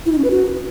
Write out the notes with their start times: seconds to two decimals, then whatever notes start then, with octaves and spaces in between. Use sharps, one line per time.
0.06 E4
0.12 D#4
0.18 C#4
0.24 B4
0.30 F#4